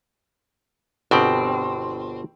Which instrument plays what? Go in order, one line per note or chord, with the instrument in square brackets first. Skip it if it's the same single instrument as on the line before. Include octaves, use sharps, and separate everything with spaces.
[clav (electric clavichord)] G1 B2 G5 [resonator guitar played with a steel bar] C4